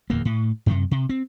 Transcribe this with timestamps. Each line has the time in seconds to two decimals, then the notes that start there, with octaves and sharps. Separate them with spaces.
0.10 D1 E2 A#3
0.25 A2
0.66 F#2 A2 C3
0.91 C3
1.09 C4